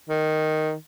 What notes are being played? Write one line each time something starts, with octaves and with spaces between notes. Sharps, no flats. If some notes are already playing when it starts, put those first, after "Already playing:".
D#3